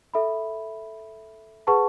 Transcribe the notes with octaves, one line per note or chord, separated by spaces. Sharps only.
A4 E5 B5
G#4 B4 F#5 A5 C#6